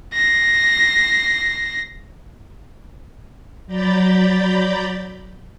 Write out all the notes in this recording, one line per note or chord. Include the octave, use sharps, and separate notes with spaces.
A#6 C7
F#3 D5 A#5 B5 G6 A6